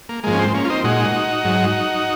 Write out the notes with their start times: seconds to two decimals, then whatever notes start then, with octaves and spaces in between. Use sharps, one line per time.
0.09 A#3
0.24 G#2 F3 G#3 A#3
0.33 C#4
0.39 C4
0.54 A#3 C#4
0.65 F4
0.70 C4 D#4
0.84 A#2 G#3 D#4 F#4
1.44 G#2 F#3